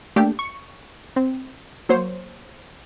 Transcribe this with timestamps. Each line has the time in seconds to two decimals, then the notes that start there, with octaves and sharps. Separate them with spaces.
0.16 A3 A#3 D4 G4
0.39 C#6
1.16 C4
1.89 F#3 A#3 C5 C#5